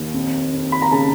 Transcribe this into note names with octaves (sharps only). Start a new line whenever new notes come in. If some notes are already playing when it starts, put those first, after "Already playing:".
Already playing: D#2
F2
F2
B5
A#5
C#3 A5